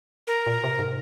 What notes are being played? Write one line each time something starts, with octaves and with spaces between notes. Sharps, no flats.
A#4
A#2
C3
G#2